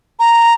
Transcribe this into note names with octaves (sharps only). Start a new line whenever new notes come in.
A#5